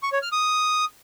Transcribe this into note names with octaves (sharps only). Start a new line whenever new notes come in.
C#6
C#5
F6
D#6